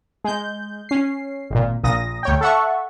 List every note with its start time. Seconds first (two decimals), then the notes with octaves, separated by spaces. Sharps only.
0.24 G#3 G6
0.89 C#4 C7
1.51 G#1 A#2
1.83 A#1 A#2 D#6 A#6
2.23 D2 C#5 G5
2.41 A4 E5 F#5 C#6